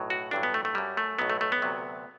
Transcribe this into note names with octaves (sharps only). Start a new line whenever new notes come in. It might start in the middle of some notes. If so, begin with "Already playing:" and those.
Already playing: B1 A2 F#3
F#4
A1 G2 D3 F#3 D4
B3
A3
A3
F#2 F#3 G3
A3
B1 A2 F#3 B3
A3
A3
B3
D2 C3 F#3